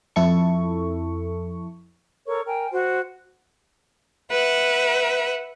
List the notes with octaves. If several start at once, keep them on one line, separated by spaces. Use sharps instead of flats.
F2 E4 A4 C#6
A4 A#4 C#5 C#6
A#4 G5 G#5
F#4 C5
B4 E5 F#5